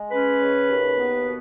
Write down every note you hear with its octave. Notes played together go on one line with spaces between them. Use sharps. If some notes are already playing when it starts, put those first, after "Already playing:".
Already playing: G#3
C#4 B4
C#3
D#2
B3
B2